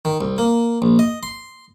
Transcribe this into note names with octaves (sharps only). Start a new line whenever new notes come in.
D#3
C2
A#3
A#1
D#5
C6